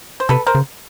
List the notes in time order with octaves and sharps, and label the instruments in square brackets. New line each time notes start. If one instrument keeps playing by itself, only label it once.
[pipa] C5
[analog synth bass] C3 [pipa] A4 B4
[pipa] A#4 C5
[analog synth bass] C#3